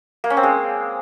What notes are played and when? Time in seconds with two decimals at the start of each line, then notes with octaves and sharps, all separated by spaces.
0.24 A#3
0.30 C#4
0.37 C4
0.43 G#3